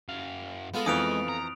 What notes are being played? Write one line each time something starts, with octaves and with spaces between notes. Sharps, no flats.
F#2 F5
G#3 B3 F4 A4
F2 E3 D#6 D7 F7
A#5